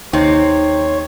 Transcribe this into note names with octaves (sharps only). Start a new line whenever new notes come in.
D#2 C3 C4 D#4 C#5